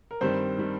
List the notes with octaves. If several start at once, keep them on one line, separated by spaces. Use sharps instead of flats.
A#4
G2 D#3 G3 C4 C5
D#3 G3